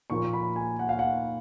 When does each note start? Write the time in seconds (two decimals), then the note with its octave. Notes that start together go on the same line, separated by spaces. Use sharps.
0.10 A#2 F3 A#3 C#6
0.33 B5
0.56 G#5
0.79 F#5
0.89 F5
0.99 F#5